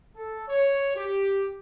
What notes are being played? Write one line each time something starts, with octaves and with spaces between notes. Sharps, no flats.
A4
C#5
G4